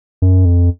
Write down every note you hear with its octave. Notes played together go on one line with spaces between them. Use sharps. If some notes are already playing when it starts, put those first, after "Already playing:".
F#2
F2